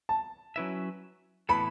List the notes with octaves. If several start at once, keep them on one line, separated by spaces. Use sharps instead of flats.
A5
F#3 C#4 E4 B4 E5
A2 E3 B3 E4 A4 B5